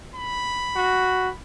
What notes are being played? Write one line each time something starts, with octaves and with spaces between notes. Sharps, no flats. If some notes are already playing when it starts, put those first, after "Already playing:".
B5
F#4